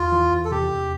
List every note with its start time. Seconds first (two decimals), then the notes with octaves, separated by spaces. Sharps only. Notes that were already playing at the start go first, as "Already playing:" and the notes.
Already playing: E2 F4
0.12 E3
0.32 E2
0.45 A4
0.51 C3 G4
0.71 E2